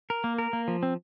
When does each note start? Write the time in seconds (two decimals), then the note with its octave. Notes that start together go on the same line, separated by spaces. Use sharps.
0.10 A#4
0.24 A#3
0.38 A#4
0.53 A#3
0.68 F3
0.83 C4